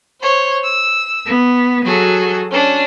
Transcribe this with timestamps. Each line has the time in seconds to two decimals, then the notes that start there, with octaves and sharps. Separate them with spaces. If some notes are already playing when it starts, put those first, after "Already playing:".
0.21 C5 C#5
0.63 E6
1.25 B3
1.85 F#3 F#4 G#4 A4
2.50 C#4 D4